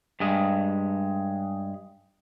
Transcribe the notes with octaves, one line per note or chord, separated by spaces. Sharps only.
G2 G#3